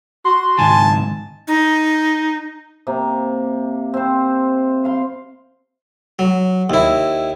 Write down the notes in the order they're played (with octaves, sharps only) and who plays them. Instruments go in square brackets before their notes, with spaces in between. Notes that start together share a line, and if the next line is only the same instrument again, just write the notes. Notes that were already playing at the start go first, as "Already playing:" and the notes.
[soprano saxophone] F#4 [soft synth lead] C6
[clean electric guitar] C#2 G#2 D#3 [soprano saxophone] G#5 [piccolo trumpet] A5
[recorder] D#4
[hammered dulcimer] C3 A#3
C4 C5
C5 F5 C6
[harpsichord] F#3
D#2 E4